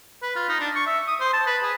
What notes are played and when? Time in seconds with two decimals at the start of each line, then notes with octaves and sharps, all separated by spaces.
0.22 B4
0.35 F4
0.49 D#4
0.60 D4
0.75 C#6
0.86 E5
1.07 D#6
1.20 C5
1.33 A5
1.47 B4
1.63 G#4